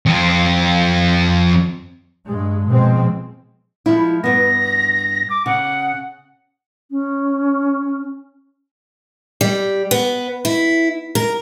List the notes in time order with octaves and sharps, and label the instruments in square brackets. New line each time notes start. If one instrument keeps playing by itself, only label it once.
[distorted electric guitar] F2 C4
[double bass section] G2 G#3
B2 F3 G#3 C4
[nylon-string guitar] F3 G#3 E4
[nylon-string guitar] G2 B3 [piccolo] A#6
[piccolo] D6
[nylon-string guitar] C#3 [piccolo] F#5
[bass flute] C#4
[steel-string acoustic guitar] G3
B3
E4
A#4